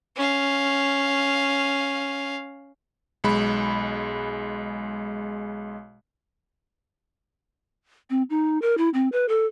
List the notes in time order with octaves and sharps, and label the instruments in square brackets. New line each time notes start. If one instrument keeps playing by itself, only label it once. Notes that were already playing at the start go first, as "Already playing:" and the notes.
[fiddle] C#4 F5
[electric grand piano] B1 G#3 B5
[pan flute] C4
D#4
A#4
E4
C4
B4
A4